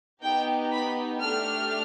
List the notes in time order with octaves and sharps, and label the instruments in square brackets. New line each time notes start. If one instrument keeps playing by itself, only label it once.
[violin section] B3 D#4 G4 G5
B5
A3 D4 G4 F6